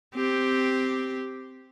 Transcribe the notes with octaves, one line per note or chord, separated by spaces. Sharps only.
C4 G4